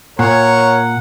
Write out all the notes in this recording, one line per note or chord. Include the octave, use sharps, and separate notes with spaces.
A#2 A#4 C#5 F#5